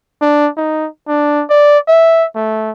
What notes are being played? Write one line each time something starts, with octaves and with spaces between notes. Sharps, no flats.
D4
D#4
D4
D5
E5
A3